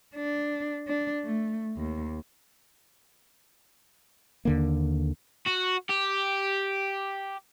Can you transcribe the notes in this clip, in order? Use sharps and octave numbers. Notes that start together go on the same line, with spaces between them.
D4
D4
A3
D#2
D#2 D3 A#3
F#4
G4